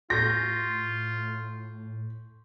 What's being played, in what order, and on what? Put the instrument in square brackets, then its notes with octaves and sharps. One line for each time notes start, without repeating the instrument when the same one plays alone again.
[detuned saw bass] A2 [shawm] F4 [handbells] C6 C#6 G6 [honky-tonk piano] A#6